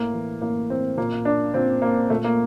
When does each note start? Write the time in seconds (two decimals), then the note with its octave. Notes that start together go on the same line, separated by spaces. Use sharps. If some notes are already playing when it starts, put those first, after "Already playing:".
Already playing: A2 A#3
0.13 E3
0.41 A2 A#3
0.69 E3 C4
0.98 A#2 A#3
1.25 D4
1.54 A#2 C4
1.82 A#3
2.10 A#2 A3
2.24 A#3